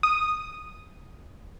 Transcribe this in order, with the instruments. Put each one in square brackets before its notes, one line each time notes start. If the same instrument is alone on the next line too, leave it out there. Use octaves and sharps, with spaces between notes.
[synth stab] D#6